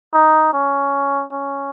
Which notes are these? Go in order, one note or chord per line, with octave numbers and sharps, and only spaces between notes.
D#4
C#4
C#4